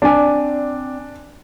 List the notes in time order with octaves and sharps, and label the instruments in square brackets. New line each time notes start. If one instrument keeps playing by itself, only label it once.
[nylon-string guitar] C4 D5 G#5 [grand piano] D4